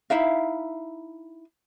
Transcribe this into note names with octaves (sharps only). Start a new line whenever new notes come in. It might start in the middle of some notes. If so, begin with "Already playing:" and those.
D#4 E4 E5 F5